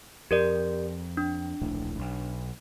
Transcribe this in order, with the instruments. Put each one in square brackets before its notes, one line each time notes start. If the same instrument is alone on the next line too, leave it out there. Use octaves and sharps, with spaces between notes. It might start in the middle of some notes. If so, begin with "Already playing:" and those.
[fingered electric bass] F2 [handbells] G4 A#4 D5
[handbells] D4
[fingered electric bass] D1 A#1 A2
B1